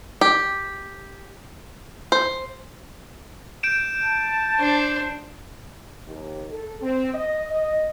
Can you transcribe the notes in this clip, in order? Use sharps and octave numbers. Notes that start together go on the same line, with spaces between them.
G4
C5
G6 D7 E7
A5
D4 C5
D#2
A4
C4
D#5
D#5